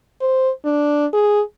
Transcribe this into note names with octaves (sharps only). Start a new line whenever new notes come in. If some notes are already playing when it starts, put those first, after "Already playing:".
C5
D4
G#4